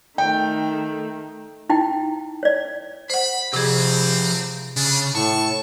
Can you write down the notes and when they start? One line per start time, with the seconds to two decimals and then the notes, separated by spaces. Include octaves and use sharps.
0.18 D#3 A3 G5
1.70 D#4 E4 G5
2.43 C#5 D5
3.10 C5 F#5 B5
3.53 C3 F3 C4 G4 G#4
4.76 C#3 D4
5.15 A2 A5 C#6